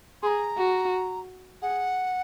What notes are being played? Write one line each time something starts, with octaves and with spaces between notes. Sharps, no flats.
G#4 A#5 C6
F#4
G#4 F#5